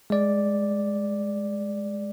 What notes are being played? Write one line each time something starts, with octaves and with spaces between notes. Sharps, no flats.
G#3 D5